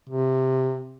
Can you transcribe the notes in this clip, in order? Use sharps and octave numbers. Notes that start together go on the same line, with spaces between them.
C3